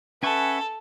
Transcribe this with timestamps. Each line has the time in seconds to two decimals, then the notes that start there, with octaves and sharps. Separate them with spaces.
0.23 C#4 A4 B4 E5 F#5 G#5 C#6